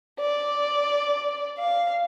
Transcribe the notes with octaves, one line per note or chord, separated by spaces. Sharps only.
D5
F5